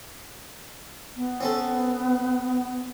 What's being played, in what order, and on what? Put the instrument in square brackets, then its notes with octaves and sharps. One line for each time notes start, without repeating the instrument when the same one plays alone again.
[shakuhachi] B3
[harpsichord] C4 C#4 A4